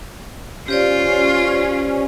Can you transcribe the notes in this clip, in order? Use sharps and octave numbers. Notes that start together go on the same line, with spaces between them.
C#4 F4 G4 C5 D5